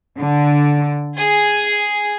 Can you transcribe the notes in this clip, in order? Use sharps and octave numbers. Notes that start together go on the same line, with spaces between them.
D3
G#4